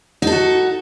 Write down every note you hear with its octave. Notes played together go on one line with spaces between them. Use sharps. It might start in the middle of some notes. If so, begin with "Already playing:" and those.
D#4 F#4 A4